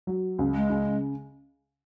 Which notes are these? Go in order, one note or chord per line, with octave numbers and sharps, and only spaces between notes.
F#3
C#2
G#3
C#3